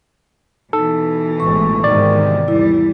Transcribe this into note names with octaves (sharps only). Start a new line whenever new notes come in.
B2 E3 D#4 A4
A1 G#2 C#6
G#2 C3 D#3 D5
E2 G3 E4